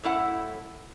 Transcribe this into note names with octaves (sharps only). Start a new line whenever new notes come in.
F#2 A2 E4 F#5